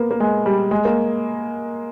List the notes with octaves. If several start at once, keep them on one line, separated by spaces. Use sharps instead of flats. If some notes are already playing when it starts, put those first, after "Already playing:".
Already playing: A#3 B3
A#3
G#3
G3
G#3
A#3